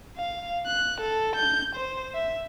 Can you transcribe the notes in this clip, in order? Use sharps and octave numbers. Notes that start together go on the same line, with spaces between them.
F5
F#6
A4
G6
C5
E5